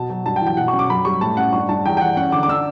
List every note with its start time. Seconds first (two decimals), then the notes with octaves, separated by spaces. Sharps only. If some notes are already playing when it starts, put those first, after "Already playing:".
Already playing: B2 A5
0.10 F#3
0.25 G2 A5
0.36 G5
0.41 E3
0.47 G5
0.57 B2 F#5
0.68 C#4 C#6
0.79 D6
0.90 F#2 B5
1.05 G3 C#6
1.21 A2 A5
1.37 C#4 F#5
1.53 G2 C#6
1.69 G2 A5
1.85 E2 G5
1.97 G5
2.01 E2 F#5
2.17 C#4 F#5
2.32 D3 D6
2.43 D6
2.48 D4 E6